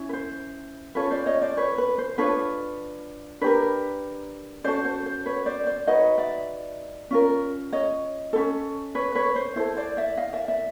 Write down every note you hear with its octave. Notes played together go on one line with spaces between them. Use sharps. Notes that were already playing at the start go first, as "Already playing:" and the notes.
Already playing: C#4 E4
B4
C5
C#4 F4 A4 B4 C#5
C5 D5
C#5 D#5
C5 D5
B4 C#5
B4
C5
D4 F4 A4 B4 C#5
D4 G4 A#4 B4 C#5
C#4 F#4 A4 C5 D5
C5
C5
B4 C#5
C5 D5
C5 D5
D#4 F#4 B4 C#5 D#5
D5 E5
C#4 F4 A#4
C#5 D#5
C#4 E4 A4
B4 C#5
B4 C#5
C5
E4 A4 C5
C5 D5
D5 E5
D#5 F5
D5 E5
D5 E5